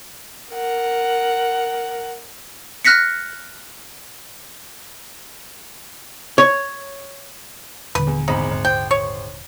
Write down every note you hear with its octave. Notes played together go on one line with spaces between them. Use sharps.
A#4 F#5
F6 F#6 A#6 B6 C#7
C#5
D#1 D3 B4
E2
G#1 E2 D#4 B5
G#1
G#1 C5 G5
C#5